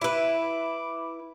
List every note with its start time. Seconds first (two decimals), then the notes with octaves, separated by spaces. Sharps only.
0.01 E4 B4 D6